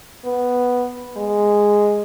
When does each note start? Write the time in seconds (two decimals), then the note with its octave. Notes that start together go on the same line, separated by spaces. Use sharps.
0.25 B3
1.17 G#3